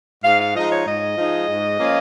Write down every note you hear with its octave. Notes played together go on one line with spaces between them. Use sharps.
G#2 F5
F5
F3 G#3 D#4 D#5
C#5
G#2 D#5
F3 G#3 D#4
G#2
F3 A#3 C#4 F4